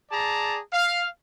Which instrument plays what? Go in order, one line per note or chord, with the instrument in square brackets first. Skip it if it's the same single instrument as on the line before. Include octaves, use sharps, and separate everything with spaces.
[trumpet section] G#4 D5 A5 A#5
F5